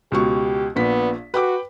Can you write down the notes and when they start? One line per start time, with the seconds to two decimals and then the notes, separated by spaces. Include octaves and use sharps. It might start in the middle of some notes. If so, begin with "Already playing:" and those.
0.12 C#2 B2 G4 C#6
0.76 A#1 A#2 B3 B6
1.34 F#4 B4 G5 D6